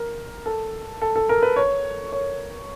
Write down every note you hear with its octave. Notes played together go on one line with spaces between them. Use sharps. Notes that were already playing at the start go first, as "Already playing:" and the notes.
Already playing: A#4
A4
A4
A4
A#4
B4
C#5
C#5